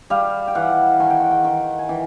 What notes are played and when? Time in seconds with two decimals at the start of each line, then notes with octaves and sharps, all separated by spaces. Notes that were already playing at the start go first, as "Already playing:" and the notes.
0.10 G3 F5
0.47 G5
0.55 E3 F#5
1.00 D#3 G#5
1.10 G5
1.20 F#5
1.31 G5
1.44 D#3
1.79 G#5
1.89 E3 G5